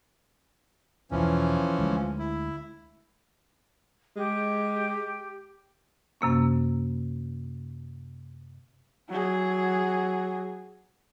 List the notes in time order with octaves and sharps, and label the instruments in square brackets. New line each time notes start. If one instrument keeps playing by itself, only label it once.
[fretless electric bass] E1 E2 [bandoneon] E3 F3 C#4
[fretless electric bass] D2 G#3
[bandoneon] E4
[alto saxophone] G#3 [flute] G4
[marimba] F#2 C3 A#3 C#4
[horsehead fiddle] F#3 G#4